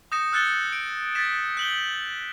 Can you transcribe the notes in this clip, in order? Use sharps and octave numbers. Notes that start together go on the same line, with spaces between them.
D#6 G6 A#6 C#7 E7
E6 F#6 G6 A6 C#7 G7
D7
A6 B6 E7
G6 F#7 G7